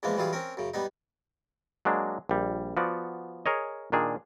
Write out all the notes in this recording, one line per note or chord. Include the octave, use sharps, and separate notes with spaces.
E2 E3 F3 G#3 A#3 B3
E3 F#3 G3 F4 G#4
C4 C#4 A#4
F#2 C#3
G3 B3 D#4
F#3 G#3 A#3 D4
A#1 G3
F3 B3 F#4 D5
G#4 A#4 C#5 D#5
A#2 D#3 D4 G#4